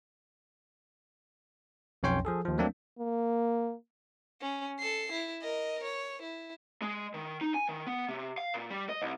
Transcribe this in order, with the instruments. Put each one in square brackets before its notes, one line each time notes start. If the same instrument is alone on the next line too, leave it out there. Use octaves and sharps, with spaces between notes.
[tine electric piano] B1 F2 C#4 C#5 G5 C6
F3 G#4 A4
D#2 F3
F#3 A3 A#3 C4 D4
[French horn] A#3
[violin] C#4
A4 C7
E4
A#4 D#5
C#5
E4
[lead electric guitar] G#3
D#3
D#4
G#5
D#3
B3
C3
F5
A#2
G3
D#5
C2